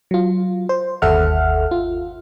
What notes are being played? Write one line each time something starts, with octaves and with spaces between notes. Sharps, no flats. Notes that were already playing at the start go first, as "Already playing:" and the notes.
F#3 F4
C5
G1 D#2 A4 E5 F#5 F6
F4